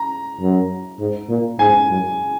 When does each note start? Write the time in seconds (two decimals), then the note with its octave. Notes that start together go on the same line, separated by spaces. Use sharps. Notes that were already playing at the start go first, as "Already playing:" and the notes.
Already playing: A#5
0.40 F#2
0.99 G#2
1.29 A#2
1.59 G#2 G#5
1.89 F#2